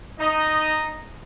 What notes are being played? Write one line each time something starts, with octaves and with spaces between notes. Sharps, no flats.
D#4 D#5